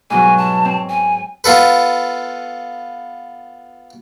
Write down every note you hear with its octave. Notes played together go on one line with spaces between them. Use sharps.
G#2 B2 F#3 G#5
A5
C4
G#5
B3 F4 A4 B4